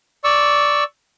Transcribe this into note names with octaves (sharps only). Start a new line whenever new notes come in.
D5 C#6 E6